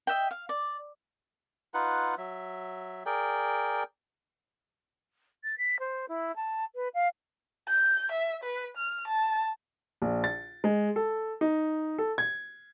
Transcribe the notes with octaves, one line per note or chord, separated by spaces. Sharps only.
D#5 E5 F#5 G5
F5
D5
D#4 F4 B4 F#5
F#3 E5
G#4 A#4 D5 G5
A6
B6
C5
E4
A5
B4
F5
G6
E5
B4
F6
A5
A#1
A6
G#3
A4
D#4
A4
G#6